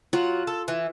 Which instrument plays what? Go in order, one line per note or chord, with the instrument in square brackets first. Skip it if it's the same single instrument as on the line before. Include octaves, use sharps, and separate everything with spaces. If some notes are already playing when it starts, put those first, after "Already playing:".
[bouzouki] F#3 F#4 [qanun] F4
[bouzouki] A4
E3